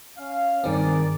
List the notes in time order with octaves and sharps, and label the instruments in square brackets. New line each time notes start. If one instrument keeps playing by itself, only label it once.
[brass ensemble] C#4 F5
[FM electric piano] G2 D#3 C4 [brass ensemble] G#4 A#4 D5